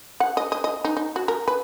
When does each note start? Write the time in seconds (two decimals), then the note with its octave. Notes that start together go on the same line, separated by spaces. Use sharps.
0.20 F#5
0.37 D#5
0.52 D#5
0.64 D#5
0.84 D#4
0.97 D#4
1.16 F#4
1.28 A#4
1.48 B4